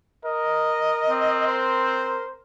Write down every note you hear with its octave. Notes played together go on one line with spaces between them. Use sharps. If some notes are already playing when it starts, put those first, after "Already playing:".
A#4 D#5
C4
C5